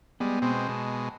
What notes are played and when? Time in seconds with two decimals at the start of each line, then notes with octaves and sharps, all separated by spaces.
0.20 G3 G#3 B3 B4
0.42 B2 G#3 C4
0.68 B2 G#3 A5